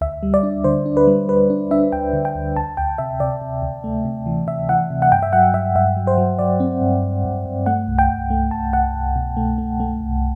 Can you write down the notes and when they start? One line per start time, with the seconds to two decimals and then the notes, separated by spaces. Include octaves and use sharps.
0.01 D2 E5
0.23 G3
0.34 D5
0.43 D4
0.64 D3 C5
0.86 D4
0.97 B4
1.07 G3
1.29 G3 B4
1.50 D4
1.71 D4 E5
1.92 D2 G5
2.13 D3
2.25 G5
2.35 D2
2.56 D2 A5
2.77 D2 G5
2.98 C3 E5
3.20 C3 D5
3.42 C3
3.62 D2
3.84 A3
4.05 C3
4.26 E3
4.47 C3 E5
4.69 E3 F#5
4.90 C3
5.02 F#5
5.12 G2 G5
5.22 E5
5.33 F#3 F#5
5.54 G2 E5
5.76 G2 E5
5.96 F#3
6.07 C5
6.18 F#3
6.39 F#3 D5
6.60 C4
6.81 G2
7.03 G2
7.25 G2
7.46 G2
7.66 A3 F#5
7.88 C2
7.99 G5
8.10 C2
8.30 A3
8.51 C2 A5
8.73 C2 F#5
8.94 C2
9.16 B2
9.37 A3
9.58 A3
9.80 A3
10.01 C2